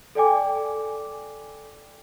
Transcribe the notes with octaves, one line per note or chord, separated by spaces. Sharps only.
A4 D5 G5 G#5 D6